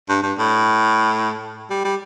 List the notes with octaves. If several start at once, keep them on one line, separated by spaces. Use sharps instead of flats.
G2
G2
A2
G3
G3